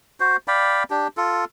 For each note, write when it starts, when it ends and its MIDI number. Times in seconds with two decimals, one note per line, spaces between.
0.20 0.37 66
0.20 0.37 72
0.48 0.84 74
0.48 0.84 77
0.48 0.84 79
0.48 0.84 83
0.90 1.08 62
0.90 1.08 67
1.17 1.45 65
1.17 1.45 69